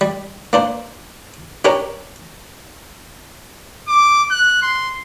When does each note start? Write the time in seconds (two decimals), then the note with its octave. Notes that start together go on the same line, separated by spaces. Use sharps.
0.01 G3
0.53 A#3 D4 C5
1.65 C#4 D4 G4 A#4
3.88 D6
4.31 F#6
4.62 C6